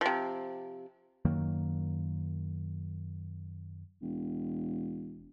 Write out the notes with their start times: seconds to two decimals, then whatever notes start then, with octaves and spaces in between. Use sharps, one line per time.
0.01 C3 F3
1.25 F#2 D#3 F#3 A#3
4.02 E1